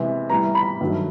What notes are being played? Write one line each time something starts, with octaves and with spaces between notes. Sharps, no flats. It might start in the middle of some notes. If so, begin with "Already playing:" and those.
Already playing: C3 E3 G#3 B3
A2 E3 G3 B3 A#5
B5
G2 D#3 F#3 A3